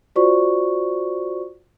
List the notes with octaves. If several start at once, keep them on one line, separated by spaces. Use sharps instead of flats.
F4 F#4 C5 D5 C#6